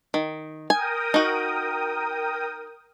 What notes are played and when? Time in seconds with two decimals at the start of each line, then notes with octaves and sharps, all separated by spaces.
0.14 D#3
0.70 A#4 G5 G#5 D#6
1.14 D#4 F#4